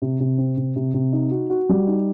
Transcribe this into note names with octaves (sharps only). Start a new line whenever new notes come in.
C3
C3
C4
C3
C3
C3
D#4
F#4
F#4
G3
D#4